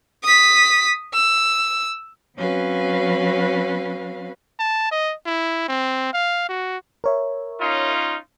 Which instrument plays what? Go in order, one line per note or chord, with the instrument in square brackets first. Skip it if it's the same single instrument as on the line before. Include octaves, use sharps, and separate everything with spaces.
[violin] D#6 B6
E6
[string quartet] F#3 C4 C#4 F#4 B4 F5
[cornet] A5
D#5
E4
C4
F5
F#4
[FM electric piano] A#4 C#5 E5
[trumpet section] C#4 D#4 F4